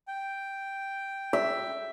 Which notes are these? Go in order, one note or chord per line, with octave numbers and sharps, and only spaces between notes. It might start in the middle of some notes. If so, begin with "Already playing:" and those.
G5
E5